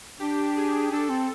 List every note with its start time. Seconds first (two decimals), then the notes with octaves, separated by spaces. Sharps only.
0.20 D4 G4
0.56 G#4
0.92 D4 A4
1.09 C4